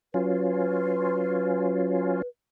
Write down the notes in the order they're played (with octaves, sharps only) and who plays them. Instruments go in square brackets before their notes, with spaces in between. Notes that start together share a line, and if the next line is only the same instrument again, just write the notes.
[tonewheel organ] F#3 C#4 F4 [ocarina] B4